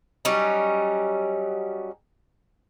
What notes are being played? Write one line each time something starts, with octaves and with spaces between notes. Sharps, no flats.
F#3 G3 C#4 D#4